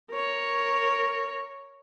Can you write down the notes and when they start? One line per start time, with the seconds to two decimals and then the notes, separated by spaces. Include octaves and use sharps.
0.11 A#4 C#5